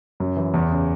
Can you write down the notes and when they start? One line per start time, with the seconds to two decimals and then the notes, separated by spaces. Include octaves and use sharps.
0.20 F#2
0.37 E3
0.54 E2
0.71 C#3